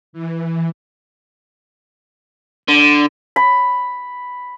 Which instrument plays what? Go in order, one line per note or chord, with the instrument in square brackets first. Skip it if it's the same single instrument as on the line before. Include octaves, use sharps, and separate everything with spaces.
[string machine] E3
[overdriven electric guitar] D3
[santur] B5